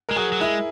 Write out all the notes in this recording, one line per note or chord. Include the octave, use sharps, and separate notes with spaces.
G#3 A#4
F#3 G#4
F#3
G#3 E4